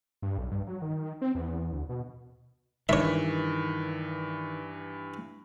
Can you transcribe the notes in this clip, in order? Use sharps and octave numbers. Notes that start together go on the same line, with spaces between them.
G2
B1
G2
F#3
D#3
C4
E2
D2
B2
G2 D#3 E3 C#5 E5